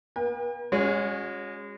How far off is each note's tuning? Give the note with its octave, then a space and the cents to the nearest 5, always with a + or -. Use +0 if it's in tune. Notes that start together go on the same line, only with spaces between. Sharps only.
B3 -35 A#4 +45 G5 +45
G#3 -30 C#4 +0 F#4 -40